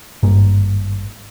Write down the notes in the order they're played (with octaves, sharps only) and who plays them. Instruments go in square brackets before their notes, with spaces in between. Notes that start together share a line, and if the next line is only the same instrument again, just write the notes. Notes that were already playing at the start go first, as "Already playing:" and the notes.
[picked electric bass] G#1 G2 A#3